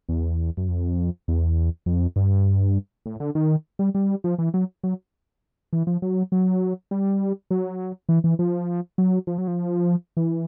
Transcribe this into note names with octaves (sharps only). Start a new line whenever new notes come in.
E2
F#2
F2
E2
F2
G2
A2
D3
D#3
G3
G3
F3
E3
F#3
F#3
E3
F3
F#3
F#3
G3
F#3
E3
E3
F3
F#3
F3
F#3
F3
E3